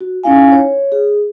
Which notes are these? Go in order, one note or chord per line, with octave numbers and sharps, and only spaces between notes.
F#4
C#4 D#4 E4 F5 G#5
C#5
G#4